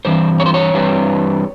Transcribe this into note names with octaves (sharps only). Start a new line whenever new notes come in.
G2 E3 C4 C5
C#5
C5
C#5
G2 E3 G3 C4